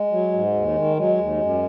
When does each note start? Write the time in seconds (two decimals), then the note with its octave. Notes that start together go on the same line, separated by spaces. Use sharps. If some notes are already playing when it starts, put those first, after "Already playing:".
Already playing: G#3
0.11 F#3
0.33 G#2
0.54 D#2
0.76 D#3
0.96 F#3 G#3
1.18 D#2
1.41 F#2